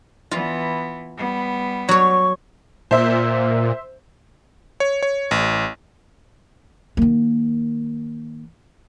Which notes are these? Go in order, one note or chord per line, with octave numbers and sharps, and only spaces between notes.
E3 B3 F4
G3 B3
F#3 C#5 C#6
A#2 C5 E5
C#5
C#5
A1
D#3 A#3